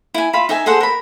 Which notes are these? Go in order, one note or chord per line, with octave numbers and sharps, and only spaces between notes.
E4 G#5
F4 E5 F5 B5
D#4 E5 G#5
G#4 A4 C5 F#5
A#4 B5